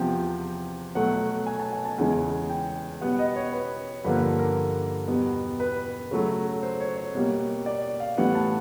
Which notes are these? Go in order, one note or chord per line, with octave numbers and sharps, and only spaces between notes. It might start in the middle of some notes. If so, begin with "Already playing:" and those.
Already playing: E2 C3 F3 G5
B2 F#3 A3 F#5
G#5
A5
G#5
A5
E2 C#3 E3 G#3 G#5
G5
B2 G3 B3 F#5
D#5
C#5
B4
G2 D3 F3 A#3 B4
A#4
A#4
E2 B2 G3 B3
B4
C#3 F#3 A3
C5
C#5
C#5
B2 G3 A#3
D5
F5
A2 E3 G3 B3 F#5
A5